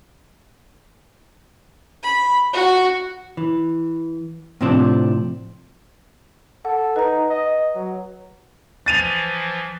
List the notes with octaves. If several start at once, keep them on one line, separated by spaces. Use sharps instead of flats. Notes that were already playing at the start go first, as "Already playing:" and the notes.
B5
F#4
E3
A2 C3 F3 C4 D4
A4 F#5
D#4 B4 A#5
D#5
F#3
E3 F3 A6 D#7 F7